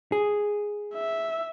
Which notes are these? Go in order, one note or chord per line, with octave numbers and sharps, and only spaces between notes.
G#4
E5